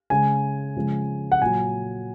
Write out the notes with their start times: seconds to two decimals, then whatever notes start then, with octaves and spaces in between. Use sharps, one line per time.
0.10 C#3 G#3 G#5
0.76 C#3 F3 G#3
1.32 F#5
1.41 A#2 F#3 G#5